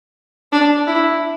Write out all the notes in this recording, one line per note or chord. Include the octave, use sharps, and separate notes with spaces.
D4
E4